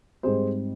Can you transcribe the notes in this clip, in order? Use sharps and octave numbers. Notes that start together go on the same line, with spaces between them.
G#2 G3 C4 G#4 C5